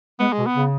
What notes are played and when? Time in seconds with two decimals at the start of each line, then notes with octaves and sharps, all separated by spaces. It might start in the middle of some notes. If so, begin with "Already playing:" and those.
0.20 G#3 B3
0.33 B2 G#3
0.47 B3
0.55 C#3